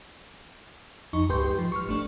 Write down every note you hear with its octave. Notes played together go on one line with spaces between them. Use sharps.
F2 D#4 C#6
C#2 G#2 G4 B4 C6 G6
G4
F3
C#6 F6
G#1 A3 D4